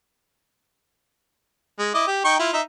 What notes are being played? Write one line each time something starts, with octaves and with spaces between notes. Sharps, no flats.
G#3
E4 D#5 D6
G4
D#4 G5 C#6
E4 F4
D#4 E5